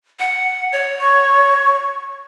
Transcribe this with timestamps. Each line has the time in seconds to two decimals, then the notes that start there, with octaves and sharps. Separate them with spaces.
0.19 F#5
0.72 C#5
1.01 C#6